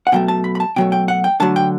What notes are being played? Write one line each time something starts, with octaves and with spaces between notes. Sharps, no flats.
F#5
B2 F#3 A3 G5
A5
B5
B5
A5
B2 F#3 A3 G5
G5
F#5
G5
D3 F#3 A3 A5
G5